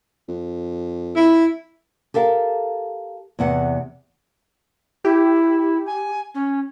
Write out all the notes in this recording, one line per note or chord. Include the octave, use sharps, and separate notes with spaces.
F2
E4
G4 A4 A#4 F5
E2 C3 F#5
E4 G4
G#5
C#4